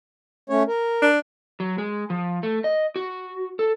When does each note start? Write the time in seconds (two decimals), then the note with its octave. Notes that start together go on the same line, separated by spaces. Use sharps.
0.50 A3 C#4 C#5
0.67 A#4
1.02 D4
1.60 F#3
1.78 G#3
2.10 F3
2.43 A3
2.64 D#5
2.96 F#4
3.59 A4